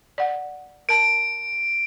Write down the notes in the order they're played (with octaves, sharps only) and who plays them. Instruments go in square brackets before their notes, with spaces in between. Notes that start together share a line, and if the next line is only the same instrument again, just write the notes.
[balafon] D5 F#5
[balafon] A#4 A5 [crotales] D7